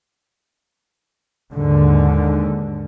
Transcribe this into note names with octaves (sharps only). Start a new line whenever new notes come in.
D#2 G#2 D3